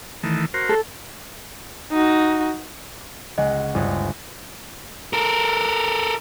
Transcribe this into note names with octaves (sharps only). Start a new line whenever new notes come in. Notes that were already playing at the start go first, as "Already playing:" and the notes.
D#3 E3 A3
F#4 A#4 C5
A4
D#4 F#4
C#2 G#3 D#5 F#5
G1 D2
A4 A#4